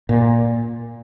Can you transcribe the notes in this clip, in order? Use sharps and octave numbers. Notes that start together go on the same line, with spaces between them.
A#2